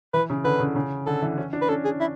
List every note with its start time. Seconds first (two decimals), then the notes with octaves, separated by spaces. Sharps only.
0.14 E3 B4
0.30 C#3
0.45 D3 B4
0.60 C#3
0.76 C#3
1.06 D3 A4
1.22 E3
1.38 C#4
1.53 D4
1.62 B4
1.69 C#4 A4
1.85 G#4
2.00 E4